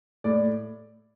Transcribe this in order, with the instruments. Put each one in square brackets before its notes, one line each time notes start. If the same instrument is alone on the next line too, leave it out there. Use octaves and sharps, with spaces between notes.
[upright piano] A2 D5